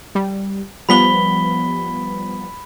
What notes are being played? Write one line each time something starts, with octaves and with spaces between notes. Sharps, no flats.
G3
F3 G3 B3 B5 B6 G7